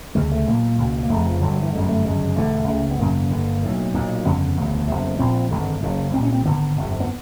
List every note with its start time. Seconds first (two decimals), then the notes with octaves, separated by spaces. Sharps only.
0.15 D2 C#3 G#3
0.32 A3
0.47 B1 A#2 A#3
0.78 C#2 B2
1.03 A#3
1.09 F1 F2 C#3 A3
1.26 F3
1.41 G1 G2 D3 F#3
1.51 F#3
1.62 E3
1.73 G1 F#2 D3 G#3
1.84 G#3
1.89 A3
2.05 G1 F#2 C#3 G#3
2.36 E1 D2 D3 A3
2.68 C#2 C#3
2.91 B3
2.99 G#1 F#2 C#3 A#3
3.30 G1 G2 D3
3.62 B1 A2
3.94 B1 A#2
4.24 G1 F2 C#3 B3
4.57 E1 D2 C#3
4.87 F#1 F2 C3
5.19 A#1 A#2 C4
5.51 G#1 G2 D3
5.82 F#1 F#2 C#3
6.13 C2 A#2 C4
6.23 C#4
6.32 C4
6.45 G#1 F#2 D3 B3
6.77 G1 F2 C3
7.00 B3